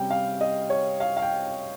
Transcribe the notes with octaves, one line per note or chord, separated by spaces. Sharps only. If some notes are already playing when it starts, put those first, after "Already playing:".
Already playing: C3 G3 C#4 G5
F5
D#5
C#5
F5
F5
G5